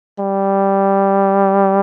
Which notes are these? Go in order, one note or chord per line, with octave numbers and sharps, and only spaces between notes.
G3